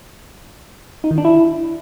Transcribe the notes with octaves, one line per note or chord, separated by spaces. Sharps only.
D#4
D#3
D4
E4